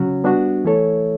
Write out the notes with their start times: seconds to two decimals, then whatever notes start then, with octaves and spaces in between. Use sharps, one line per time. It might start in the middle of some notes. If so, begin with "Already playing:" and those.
Already playing: C#3 F#3 C#4 F#4
0.24 G3 B3 D4 F#4
0.65 E3 A3 E4 A4 C#5